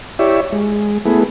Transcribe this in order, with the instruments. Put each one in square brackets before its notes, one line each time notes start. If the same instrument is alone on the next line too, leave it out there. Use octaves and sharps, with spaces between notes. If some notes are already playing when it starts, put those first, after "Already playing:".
[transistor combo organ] E4 G4 C#5 D5 E5
G#3
A3 B3 E4 G#4